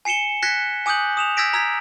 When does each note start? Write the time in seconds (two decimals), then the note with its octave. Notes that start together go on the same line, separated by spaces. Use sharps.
0.05 G#5 C7 C#7 E7 G7
0.43 F#6 G#6 A#6 B6 C#7
0.86 G#5 D6 D#6 F#6 G6 F#7
1.17 D#6 E7 F7
1.37 E6 G6 G#6 A#6 B6 D7
1.53 A#5 E6 G#6 B6